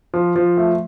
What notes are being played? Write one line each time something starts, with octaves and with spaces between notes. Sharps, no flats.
F3
F3
A3